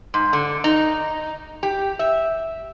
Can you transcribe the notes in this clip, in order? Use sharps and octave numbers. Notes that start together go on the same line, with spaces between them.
G#2
D3
D#4
G4
E5